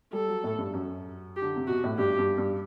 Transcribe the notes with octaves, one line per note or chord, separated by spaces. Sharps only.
G3 A4
F#3
A2
G2
F#2
G4
D3
C3
B2 F#4
A2
G2 G4
G2
G2